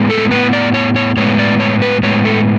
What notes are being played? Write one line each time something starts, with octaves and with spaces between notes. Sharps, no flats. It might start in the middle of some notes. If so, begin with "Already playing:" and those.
Already playing: A2 G#3 B3
A4
A2 G#3 B3 B4
D5
C#5
C#5
A2 G#3 B3 C#5
D5
C#5
B4
A2 G#3 B3 C#5
A4